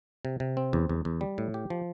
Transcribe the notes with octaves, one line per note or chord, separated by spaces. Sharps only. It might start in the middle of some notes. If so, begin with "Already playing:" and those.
C3
C3
C4
E2
E2
E2
G3
A2
G4
F3